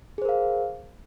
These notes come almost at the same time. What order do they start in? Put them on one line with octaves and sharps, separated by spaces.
G#4 C5 A#4 F5